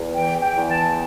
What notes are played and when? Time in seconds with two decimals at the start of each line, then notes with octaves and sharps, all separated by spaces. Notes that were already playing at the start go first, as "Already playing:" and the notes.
Already playing: E2
0.14 E3 G5
0.42 G5
0.56 E2
0.69 A5